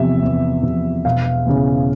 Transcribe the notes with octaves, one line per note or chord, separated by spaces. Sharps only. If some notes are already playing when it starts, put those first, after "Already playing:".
Already playing: E2 C3 F3 E5
E2
C3 F3
E1 F5
E2 C#3 E3